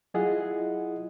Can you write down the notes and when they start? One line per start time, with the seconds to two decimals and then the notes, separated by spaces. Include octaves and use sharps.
0.14 F#3 E4 F4 G#4 D#5 F#5